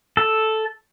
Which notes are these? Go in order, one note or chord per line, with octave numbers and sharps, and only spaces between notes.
A4